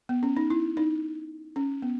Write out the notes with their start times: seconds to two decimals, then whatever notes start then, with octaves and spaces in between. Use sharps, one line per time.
0.09 B3
0.23 C#4
0.37 D#4
0.50 E4
0.77 D#4
1.56 C#4
1.82 B3